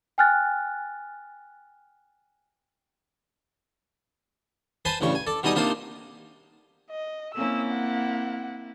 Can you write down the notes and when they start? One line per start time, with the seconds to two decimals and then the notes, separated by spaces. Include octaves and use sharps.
0.18 G5 G#5 F6 F#6 A6
4.85 B4 C5 G#5 A5 B5 C6
5.01 A1 G2 C#3 C#6
5.15 G#5
5.27 A4 D5
5.43 B2 G3 D#4 D#5 G#5 D#6
5.55 C3 A#3 D4 D#4 F4 C5
6.91 D#5
7.35 A#3 C4 C#4 E4 E6
7.73 F#5